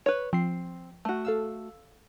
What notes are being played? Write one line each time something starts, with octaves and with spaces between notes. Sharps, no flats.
B4 C#5
F3 C4 C7
A3 F#4
A4 F5 E6